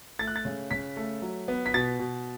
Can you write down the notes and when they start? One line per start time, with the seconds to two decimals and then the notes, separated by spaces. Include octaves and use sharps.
0.19 A3 A6
0.27 F#6
0.36 A6
0.45 C#3
0.71 C#3 B6
0.97 A3
1.22 F#3
1.48 B3
1.66 B6
1.74 B2 A6
1.99 B2